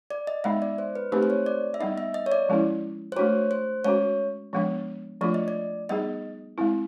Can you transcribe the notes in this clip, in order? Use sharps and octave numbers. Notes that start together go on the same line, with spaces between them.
D5
D#5
G#3 B3 D#4 E5
D5
C5
B4
A3 C4 D#4 G4 B4 C5
C5
C#5
D5
E5
G3 B3 D#4 D#5
E5
D#5
C#5
D5
F3 G#3 C#4 E4
C5
A3 D4 F#4 C#5
C5
G#3 C#4 F#4 C#5
F3 G#3 B3 D4
F3 A3 D4 F4 D5
D#5
D5
G3 B3 D#4 G#4 D#5
G#3 C4 E4